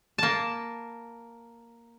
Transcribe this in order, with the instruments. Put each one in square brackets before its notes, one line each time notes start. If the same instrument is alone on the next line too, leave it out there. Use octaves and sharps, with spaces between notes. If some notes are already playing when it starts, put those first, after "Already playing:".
[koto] A#3 A5